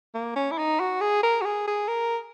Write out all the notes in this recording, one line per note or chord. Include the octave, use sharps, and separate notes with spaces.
A#3
C#4
E4
D#4
F#4
G#4
A#4
F#4
G#4
G#4
A#4